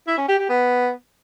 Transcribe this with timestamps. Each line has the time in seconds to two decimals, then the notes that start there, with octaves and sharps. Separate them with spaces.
0.07 E4
0.18 C#4
0.28 G4
0.39 G4
0.49 B3